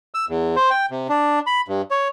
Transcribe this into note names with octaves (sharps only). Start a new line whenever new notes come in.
E6
E2
C5
G5
C3
D4
B5
G2
C#5